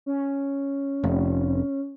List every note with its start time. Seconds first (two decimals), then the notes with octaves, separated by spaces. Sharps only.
0.06 C#4
1.03 F1